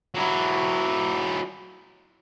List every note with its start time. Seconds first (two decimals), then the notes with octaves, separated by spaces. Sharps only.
0.14 F#3 E4